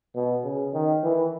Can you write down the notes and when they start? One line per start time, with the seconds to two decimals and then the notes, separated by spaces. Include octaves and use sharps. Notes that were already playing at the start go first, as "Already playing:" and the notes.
0.16 B2
0.44 C#3
0.73 D#3
1.03 E3